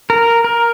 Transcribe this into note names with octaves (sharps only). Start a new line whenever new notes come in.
A#4
A#4